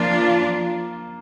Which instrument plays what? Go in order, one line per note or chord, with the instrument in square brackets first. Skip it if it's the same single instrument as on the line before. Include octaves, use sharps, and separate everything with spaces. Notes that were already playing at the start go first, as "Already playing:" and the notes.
Already playing: [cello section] F3 D4 F4 [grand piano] A#3